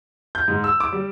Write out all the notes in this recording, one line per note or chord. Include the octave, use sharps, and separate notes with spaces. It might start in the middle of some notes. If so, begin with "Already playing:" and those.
G6
G#2
E6
D6
G3